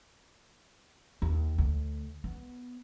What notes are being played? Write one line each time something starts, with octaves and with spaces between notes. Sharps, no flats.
D#2
D2
B3